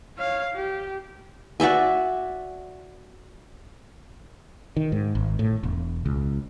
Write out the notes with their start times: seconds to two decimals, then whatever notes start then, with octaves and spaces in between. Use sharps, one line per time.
0.18 C#5 F5
0.54 G4
1.60 F#4 D5 E5 G#5
4.77 D#3
4.92 G#2
5.15 G#1
5.39 A2
5.63 E1
6.06 C#2